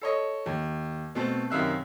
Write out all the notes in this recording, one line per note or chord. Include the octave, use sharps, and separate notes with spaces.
A4 C#5 D#5
D#2
B2 A3 C4
F#2 C3 D#3 E5 F5 F#6